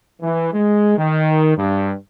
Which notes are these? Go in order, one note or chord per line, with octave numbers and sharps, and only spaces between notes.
E3
G#3
D#3
G2